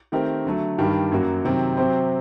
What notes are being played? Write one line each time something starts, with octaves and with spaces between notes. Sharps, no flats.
D#3 A3 C4 G4 A#4
D3 F#3 A3
G2 D#3 G3
F#2 F#3 A#3 F#4
C3 D#3 F#3 C4
C3 F#3 C4 G4 C5